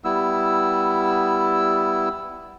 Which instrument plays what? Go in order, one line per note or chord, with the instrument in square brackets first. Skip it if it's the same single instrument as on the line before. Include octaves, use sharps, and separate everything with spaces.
[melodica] G3 B3 E4 E6